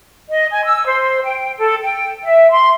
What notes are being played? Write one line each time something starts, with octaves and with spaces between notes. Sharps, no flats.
D#5
G#5
E6
C5
G5
A4
G5
E5
C6